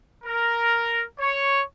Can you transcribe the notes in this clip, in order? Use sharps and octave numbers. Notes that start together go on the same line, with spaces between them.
A#4
C#5